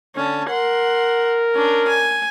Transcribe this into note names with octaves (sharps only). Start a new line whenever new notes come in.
D3 C#4 A5
A#4 F#5 C6
C#4 D4
G#5